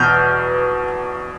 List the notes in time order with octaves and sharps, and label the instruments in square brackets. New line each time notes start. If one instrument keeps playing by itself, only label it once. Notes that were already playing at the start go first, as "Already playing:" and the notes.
Already playing: [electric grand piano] E2 B2 F6 G6